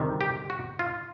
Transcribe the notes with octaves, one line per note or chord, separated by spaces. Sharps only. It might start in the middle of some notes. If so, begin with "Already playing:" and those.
Already playing: D2 C3 D#3 G3
G4
F#4
F4